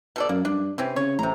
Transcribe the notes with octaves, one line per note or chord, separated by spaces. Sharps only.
B2 A4 D5
F#2 A#3
G2 D4
C3 E3 C4 C#4
C#3 C#5
A1 C3 A#5